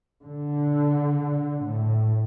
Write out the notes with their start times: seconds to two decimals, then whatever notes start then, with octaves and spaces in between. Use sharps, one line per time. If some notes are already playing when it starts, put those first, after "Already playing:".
0.25 D3
1.64 A2